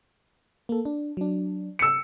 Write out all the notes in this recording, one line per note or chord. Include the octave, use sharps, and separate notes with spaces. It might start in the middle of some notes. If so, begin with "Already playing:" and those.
A#3 A4
D4
F#3 D4
E6 C#7